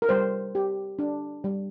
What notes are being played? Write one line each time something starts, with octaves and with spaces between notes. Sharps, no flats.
A#4
G3 C5
G4
D4
G3